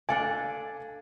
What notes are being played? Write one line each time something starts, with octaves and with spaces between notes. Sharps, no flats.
D4 A4 D5 F5 G#5